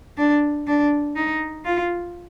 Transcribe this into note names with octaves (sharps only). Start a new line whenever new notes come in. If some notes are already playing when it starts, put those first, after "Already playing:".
D4
D4
D#4
F4